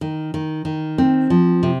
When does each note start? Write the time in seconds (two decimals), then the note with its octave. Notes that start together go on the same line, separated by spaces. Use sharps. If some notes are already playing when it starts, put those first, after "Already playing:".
0.01 D#3
0.34 D#3
0.65 D#3
0.98 C4
1.30 F3
1.63 C3